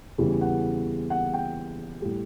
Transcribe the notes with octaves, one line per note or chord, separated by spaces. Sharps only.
E2 C#3 E3 G3
F#5
F#5
G5
A2 G3